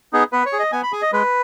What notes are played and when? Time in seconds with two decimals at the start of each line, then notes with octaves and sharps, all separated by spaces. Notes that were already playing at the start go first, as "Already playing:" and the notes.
0.13 B3 D#4 G#4
0.32 B3 B4
0.46 C#5
0.53 G#4
0.59 D#5
0.72 B3 G#5
0.83 B5
0.92 G#4 G#5
1.02 D#5
1.13 G#3 B4